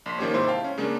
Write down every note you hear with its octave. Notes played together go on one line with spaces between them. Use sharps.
A#1 C6 B6
D#3 F3 A#3 C#4 G4 C#5
G#2 C3 E4 C5 C6
F5 G5 A5
C#4
C#3 G#3 A#3 C#4 D4